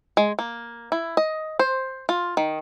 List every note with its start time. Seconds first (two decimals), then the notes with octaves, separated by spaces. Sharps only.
0.17 G#3
0.39 A#3
0.92 E4
1.17 D#5
1.59 C5
2.09 F4
2.37 D#3